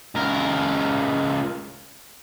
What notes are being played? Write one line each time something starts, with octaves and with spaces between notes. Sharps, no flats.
C#2 A#4